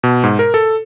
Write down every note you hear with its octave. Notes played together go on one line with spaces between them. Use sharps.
B2
G#2
A#4
A4